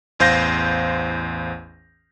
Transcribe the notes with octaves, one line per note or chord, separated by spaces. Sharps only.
A1 E2 C5 F5 G6 A#6